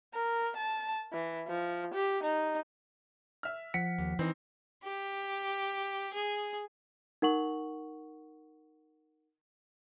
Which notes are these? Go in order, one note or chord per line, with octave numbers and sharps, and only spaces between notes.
A#4
A5
E3
F3
G4
D#4
E5 F6
F3 F#5 B6 C#7
D#2
E3 C4 D#4
G4
G#4
D#4 A#4 F#5 C#6 F#7